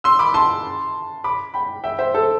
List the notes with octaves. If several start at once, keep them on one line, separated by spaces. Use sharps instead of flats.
C6 E6
B5 D6
A5 C6
B5 D6
G5 B5
E5 G5
C5 E5
A4 C5